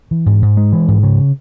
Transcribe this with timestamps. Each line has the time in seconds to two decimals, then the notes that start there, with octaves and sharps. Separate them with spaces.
0.11 E3
0.26 G#2
0.42 G#2
0.57 G#3
0.73 E3
0.88 G#2
1.03 C#3